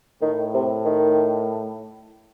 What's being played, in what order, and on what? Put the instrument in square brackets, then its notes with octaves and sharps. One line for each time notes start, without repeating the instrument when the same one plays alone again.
[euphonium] A2 [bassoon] D#3
[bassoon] C3
D#3